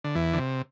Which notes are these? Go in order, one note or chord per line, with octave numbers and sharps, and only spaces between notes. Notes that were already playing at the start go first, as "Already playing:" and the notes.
D3
E2 E3
D3
C3